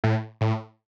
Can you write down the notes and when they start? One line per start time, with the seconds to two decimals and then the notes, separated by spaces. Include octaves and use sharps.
0.04 A2
0.41 A2